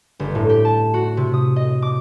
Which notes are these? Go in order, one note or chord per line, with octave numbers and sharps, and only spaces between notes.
G1
A2
G4
A5
F#4
C3
D#6
D#5
D6